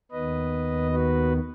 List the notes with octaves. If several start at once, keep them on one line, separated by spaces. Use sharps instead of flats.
D#2 D#3 B3 B4 D#5
F#4 B4